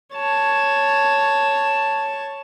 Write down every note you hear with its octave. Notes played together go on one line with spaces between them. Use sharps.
C#5 A5